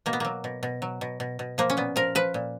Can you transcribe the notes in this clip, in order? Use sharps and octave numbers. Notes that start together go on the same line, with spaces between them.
B2 A#3
B3
F#3 A#3
B2
B2
F#3
B2
B2
B2
F3 A#3
C#4
A#2 B3
F3 A#4
F3 B4
A#2